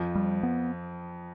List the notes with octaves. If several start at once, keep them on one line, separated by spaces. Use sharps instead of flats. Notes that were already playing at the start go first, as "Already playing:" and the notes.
Already playing: F2 F3
G3
B3